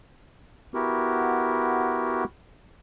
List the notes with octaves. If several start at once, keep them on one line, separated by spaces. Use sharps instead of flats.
B3 E4 F#4 G4 A#4